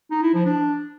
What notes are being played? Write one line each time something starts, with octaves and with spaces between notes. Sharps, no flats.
D#4
E4
F3
D4